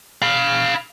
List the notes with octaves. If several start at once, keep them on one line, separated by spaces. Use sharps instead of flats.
F5 B5